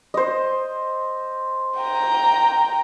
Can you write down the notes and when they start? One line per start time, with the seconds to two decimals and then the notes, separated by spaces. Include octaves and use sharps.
0.14 C5 D#5
1.79 G5 A#5